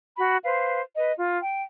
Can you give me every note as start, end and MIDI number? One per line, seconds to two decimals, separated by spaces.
0.17 0.36 66
0.17 0.36 83
0.44 0.79 71
0.44 0.79 72
0.44 0.79 77
0.97 1.12 71
0.97 1.12 75
1.17 1.37 65
1.41 1.61 79